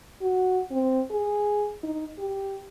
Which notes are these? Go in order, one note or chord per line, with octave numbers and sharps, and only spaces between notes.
F#4
C4
G#4
D#4
G4